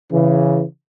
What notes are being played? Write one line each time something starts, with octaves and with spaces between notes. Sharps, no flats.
C#3 E3